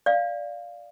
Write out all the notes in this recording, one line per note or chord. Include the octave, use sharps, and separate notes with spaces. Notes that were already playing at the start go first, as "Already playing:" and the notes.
D5 F5